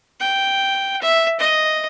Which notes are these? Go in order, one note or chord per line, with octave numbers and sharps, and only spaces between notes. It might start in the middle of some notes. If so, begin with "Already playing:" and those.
G5
E5
D#5